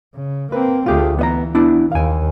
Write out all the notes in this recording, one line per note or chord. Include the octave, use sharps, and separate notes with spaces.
C#3
A#3 C4 B4
D2 A3 F4 G4 G#4
E3 B3 D#5 A#5
B3 D4 E4
D#2 F5 G#5